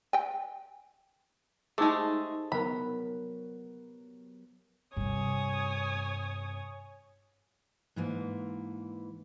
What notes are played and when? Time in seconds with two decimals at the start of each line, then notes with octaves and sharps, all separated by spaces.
0.13 G5 G#5
1.78 G#3 A3 D#4 G4 G#4 C5
2.52 F#3 B3 A#4 B5
4.96 G2 C3 C#5 G#5 D#6
7.96 G#2 E3 A#3